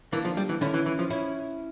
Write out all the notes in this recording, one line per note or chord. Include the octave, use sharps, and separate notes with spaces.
E3 A#3 D4
F3
G3
E3
D3 C#4 E4
E3
E3
F3
C#4 E4